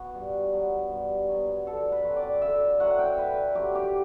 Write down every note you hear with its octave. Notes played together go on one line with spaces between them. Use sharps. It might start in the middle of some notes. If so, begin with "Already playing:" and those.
Already playing: B3 F#4
G2
F#3 B3
G2
F#3 B3
D3 A4
B4
F#3 C4
D5
D3 E5
F#3 C4 F#5
G5
D3 B4
F#3 C4 G4
G4